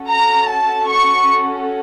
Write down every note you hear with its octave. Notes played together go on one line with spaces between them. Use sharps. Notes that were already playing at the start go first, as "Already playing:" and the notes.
Already playing: C#4 F#4 A4
A#5
A5
C#6